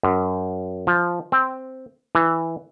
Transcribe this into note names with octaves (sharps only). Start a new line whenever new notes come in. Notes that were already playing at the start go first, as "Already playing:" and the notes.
F#2
F3
C4
E3